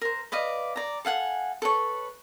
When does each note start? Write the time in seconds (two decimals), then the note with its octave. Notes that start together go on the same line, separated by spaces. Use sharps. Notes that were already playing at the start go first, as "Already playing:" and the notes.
0.02 A#4 C5
0.32 B4 D5 D#5 F5
0.76 D5 A#5
1.05 A4 F5 F#5 G#5
1.62 A4 B4 C#5